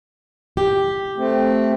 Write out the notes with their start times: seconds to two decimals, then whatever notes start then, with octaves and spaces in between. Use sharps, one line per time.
0.57 G4
1.18 A3 C4